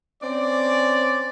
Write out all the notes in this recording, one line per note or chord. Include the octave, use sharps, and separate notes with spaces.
C4 C#4 D5